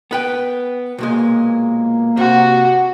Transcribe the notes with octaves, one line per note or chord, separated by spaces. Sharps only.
B3 B4 G5
B1 A#2 G#3 A#3
C3 F#4